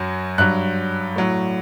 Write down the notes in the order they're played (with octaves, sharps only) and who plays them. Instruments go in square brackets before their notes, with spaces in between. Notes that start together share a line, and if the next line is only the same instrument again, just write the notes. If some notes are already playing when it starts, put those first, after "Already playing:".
Already playing: [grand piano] F#2 F#3
G2 F#3 F#6
A2 F#3